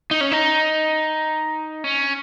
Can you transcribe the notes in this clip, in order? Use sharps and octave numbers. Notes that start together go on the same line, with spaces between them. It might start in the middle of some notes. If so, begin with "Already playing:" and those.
D#4
C#4
D#4
C#4